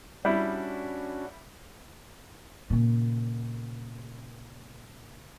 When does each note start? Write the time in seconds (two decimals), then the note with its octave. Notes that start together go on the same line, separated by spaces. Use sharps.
0.25 G3 C#4 D4 E4 F#4
2.70 A#2 C#3